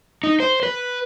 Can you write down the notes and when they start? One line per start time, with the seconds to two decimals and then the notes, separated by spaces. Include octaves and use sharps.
0.24 D#4
0.40 C5
0.63 B4